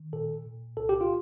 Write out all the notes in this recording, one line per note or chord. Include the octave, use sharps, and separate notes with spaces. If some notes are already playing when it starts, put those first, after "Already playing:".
Already playing: D#3
A#2 A4
A#2
C2 A4
G4
F4